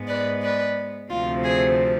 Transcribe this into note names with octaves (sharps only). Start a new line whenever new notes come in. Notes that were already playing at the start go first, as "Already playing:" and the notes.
Already playing: G#2 G#3 B3
B4 D5
B4 D5
D2 C3 F3 A3 C4 F4
G#4